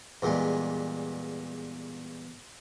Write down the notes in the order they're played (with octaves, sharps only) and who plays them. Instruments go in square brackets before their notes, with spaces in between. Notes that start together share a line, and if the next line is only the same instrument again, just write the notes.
[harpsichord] E2 A#2 G3 G#3